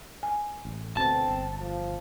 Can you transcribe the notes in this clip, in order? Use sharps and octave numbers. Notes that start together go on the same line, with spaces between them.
G#5
A1
D2 B2 C4 A5
G1
F3